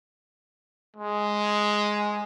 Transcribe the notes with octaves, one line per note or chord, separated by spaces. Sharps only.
G#3